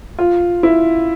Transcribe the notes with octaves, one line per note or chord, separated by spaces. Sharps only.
F4
E4